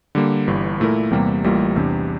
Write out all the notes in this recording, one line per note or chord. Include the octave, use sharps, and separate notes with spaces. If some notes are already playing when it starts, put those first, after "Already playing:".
D3 G3 A#3
G1 G2 E3
A#2 A3 E4 A#4
E2 C3 G3 A#3
A1 A2 G3 A#3 F4
E2 C3 G3 D4